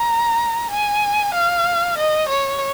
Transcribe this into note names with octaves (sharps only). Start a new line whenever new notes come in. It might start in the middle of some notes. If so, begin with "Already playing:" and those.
Already playing: A#5
G#5
F5
D#5
C#5